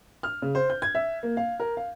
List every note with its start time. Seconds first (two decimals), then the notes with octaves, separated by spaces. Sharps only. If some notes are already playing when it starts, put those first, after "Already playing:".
0.23 F6
0.42 C#3
0.55 C5
0.70 G6
0.82 G#6
0.95 E5
1.23 A#3
1.37 F5
1.60 A#4
1.77 F5